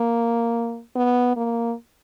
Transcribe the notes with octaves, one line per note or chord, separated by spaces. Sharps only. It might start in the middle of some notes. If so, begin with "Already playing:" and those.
Already playing: A#3
B3
A#3